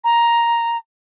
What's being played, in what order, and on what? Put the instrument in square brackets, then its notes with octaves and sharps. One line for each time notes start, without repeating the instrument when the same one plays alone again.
[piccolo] A#5